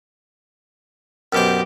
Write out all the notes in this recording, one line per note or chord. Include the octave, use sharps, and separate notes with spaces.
F#2 B2 G4 C5